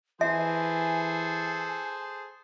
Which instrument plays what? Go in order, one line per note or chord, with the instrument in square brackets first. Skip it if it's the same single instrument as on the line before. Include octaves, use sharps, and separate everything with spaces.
[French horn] E3 [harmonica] G#4 A4 C5 [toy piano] E5 [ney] G#5